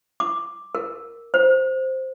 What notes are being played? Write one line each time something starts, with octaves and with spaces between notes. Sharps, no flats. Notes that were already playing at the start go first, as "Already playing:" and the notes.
D6
A#4
C5